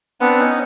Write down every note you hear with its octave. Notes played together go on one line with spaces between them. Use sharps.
B3 C4 D4
C#4 D#4